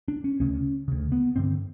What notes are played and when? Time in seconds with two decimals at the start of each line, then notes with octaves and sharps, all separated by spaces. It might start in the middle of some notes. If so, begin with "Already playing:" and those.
0.08 D4
0.24 C#4
0.40 D2 C#3 C#4
0.88 D2 C#3
1.12 B3
1.36 A1 G2 D3 C4